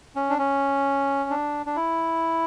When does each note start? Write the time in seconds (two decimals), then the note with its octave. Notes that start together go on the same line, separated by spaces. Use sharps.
0.16 C#4
0.30 D4
0.38 C#4
1.30 D4
1.66 D4
1.76 E4